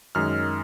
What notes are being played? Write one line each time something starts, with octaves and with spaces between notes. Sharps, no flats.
F#2 D#3 G#3 F6